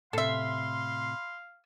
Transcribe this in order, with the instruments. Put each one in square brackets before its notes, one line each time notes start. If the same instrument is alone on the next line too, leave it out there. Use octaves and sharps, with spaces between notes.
[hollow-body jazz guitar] A2 C3 [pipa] A4 E5 [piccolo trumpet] F5 [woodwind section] B5 C6